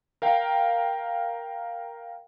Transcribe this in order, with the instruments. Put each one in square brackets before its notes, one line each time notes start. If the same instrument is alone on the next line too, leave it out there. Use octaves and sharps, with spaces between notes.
[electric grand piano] A#4 F5 G5